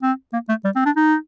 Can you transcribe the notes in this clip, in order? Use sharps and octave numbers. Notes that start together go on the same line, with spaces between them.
C4
A#3
A3
G3
C4
D4
D#4